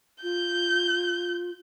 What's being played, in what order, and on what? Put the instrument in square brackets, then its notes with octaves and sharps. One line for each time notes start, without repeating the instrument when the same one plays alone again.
[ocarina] F4 [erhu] G6